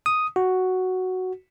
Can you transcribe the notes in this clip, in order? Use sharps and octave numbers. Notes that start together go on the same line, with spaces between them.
D#6
F#4